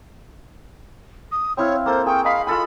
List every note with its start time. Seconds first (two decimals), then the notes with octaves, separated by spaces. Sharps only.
1.32 D#6
1.57 C4 E4 C#5 F5
1.86 A#3 A4 C5
2.06 G#4 G5 C#6
2.25 D#5 F5 B5
2.47 F4 A4 G#5 B5